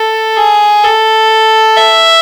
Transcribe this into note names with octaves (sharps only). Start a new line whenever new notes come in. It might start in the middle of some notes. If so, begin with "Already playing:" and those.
Already playing: A4
G#4
A4
E5